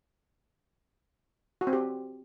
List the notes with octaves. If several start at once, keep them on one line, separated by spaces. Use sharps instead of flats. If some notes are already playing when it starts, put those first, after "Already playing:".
F#4
C4
G4